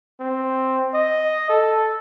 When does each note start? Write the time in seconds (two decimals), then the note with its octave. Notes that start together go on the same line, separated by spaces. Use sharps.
0.20 C4
0.94 D#5
1.49 A4